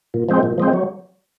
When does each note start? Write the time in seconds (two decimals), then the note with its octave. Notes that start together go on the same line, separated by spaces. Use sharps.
0.14 A#2
0.29 F3 G#3 C4
0.43 A#2
0.58 F3 G#3 C4
0.73 F#3